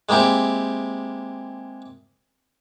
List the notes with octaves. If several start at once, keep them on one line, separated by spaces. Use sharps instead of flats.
G#3 A#3 C4 E4 G4